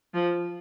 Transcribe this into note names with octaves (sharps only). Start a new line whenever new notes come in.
F3